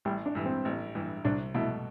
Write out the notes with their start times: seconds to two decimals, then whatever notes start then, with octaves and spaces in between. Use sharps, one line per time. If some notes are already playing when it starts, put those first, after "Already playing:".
0.05 A1 G3
0.25 D4
0.35 G2 E3
0.45 C4
0.65 A1
0.95 G2 E3
1.24 C2 D4
1.54 B2 A3 E4